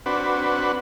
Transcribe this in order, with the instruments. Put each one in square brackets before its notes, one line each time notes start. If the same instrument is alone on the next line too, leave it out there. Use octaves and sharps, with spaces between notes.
[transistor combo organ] C4 D4 F#4 B4